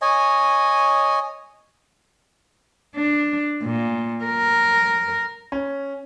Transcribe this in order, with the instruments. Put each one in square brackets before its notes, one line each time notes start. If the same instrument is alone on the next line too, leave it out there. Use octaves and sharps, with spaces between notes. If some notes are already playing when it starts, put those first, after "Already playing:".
[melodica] C#5 D#5 G#5
[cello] D4
A#2
A#4
[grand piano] C#4